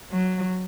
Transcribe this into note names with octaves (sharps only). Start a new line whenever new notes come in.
F#3